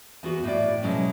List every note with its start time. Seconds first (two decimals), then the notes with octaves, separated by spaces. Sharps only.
0.23 E2 B3 F#4
0.44 A2 D5
0.82 B2 F#3 G#3 C#4